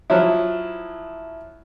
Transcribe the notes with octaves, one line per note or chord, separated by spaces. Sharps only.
F3 F#3 E4